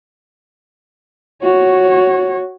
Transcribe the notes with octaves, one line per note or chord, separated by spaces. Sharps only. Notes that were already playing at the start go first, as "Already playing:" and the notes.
F#4 C#5